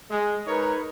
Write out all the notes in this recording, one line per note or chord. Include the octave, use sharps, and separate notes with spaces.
G#3
D#4 A#4 B4 C#5